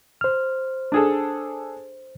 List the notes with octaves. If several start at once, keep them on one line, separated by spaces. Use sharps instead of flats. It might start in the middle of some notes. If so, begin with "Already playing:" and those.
C5 F6
D4 G#4 A4